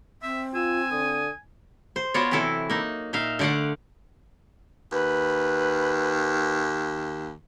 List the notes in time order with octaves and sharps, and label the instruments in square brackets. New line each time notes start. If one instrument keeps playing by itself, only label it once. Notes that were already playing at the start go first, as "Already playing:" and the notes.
[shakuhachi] C4 [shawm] E5
[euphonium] F4 [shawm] G#5 [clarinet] E6
[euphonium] D3 [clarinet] D#6
[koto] C5
B3 F4 F#4 C#5 D5 A5
C3 E3 F#3 E4 A4
A#3 D#4
A#2 D#4 E5 F5
D3 A3 D5 F5 F#5
[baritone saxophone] D#2 [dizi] B4